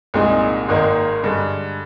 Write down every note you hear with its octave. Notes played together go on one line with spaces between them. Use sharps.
C2 A#2 G#3 D#4
G#1 G#2 D#3 A#3 D#4
G2 D3 G#3